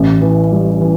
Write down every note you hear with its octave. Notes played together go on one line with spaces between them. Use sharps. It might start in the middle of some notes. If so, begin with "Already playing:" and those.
Already playing: A1
E3
G3
E3